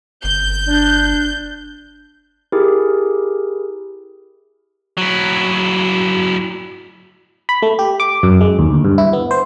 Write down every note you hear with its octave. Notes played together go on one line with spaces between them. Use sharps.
G1 G6
D4
E4 G4 G#4 A#4
F#3 E4
B5
A3
G4
D6
F#2
G#3
D#2
D2
G2
E4
B3
C5